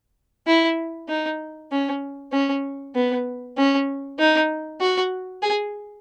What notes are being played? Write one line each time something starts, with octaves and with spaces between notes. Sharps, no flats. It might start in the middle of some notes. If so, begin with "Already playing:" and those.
E4
D#4
C#4
C#4
B3
C#4
D#4
F#4
G#4